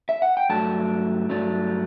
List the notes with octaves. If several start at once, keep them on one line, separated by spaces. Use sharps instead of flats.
E5
F#5
G5
G2 F#3 A3 D4 A5
G2 F#3 A3 D4